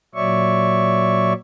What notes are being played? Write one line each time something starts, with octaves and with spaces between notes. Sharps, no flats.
A#2 F#3 C#5 D5 E5 C#6